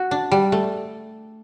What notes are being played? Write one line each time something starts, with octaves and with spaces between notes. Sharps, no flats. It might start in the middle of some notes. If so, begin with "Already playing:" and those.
Already playing: F#4
D4
G3
A3